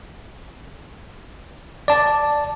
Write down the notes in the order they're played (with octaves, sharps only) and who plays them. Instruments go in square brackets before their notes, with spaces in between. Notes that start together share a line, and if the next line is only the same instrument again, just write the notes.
[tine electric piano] D5 A5